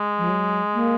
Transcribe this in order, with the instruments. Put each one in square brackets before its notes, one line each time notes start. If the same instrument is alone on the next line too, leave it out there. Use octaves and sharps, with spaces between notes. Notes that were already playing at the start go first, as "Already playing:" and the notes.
Already playing: [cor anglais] G#3
[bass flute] F3
F#3
A#3